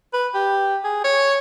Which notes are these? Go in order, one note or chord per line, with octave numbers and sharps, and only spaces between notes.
B4
G4
G#4
C#5